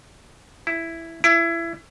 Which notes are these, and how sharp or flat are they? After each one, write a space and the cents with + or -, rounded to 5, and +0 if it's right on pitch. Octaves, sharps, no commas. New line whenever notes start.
E4 +5
E4 +25